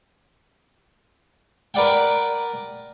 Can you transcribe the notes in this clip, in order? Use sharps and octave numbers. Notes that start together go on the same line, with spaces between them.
A#4 B4 D5 F#5 G5